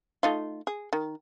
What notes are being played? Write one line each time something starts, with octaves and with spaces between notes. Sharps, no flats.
A3 D#4 F4
G#4
D#3